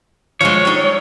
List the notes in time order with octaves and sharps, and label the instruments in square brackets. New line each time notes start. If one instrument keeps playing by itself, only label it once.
[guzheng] F3 F#3 G#3 [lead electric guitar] C#5
[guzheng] G3 D#4